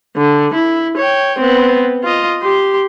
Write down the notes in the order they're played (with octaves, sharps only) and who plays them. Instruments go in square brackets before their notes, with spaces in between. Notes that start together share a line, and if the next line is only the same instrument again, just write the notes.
[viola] D3
E4
C#5 G5
B3 C4
F4 D#5
G4 C6